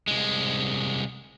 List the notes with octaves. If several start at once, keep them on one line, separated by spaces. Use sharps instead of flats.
C2 G#3